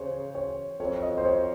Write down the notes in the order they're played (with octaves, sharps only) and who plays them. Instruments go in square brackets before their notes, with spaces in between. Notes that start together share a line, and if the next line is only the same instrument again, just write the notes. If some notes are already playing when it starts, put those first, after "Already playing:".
Already playing: [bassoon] C#3 [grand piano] C5 C#5
[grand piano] C#5
[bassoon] F2 [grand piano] C#5
[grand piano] D#5
C5
C#5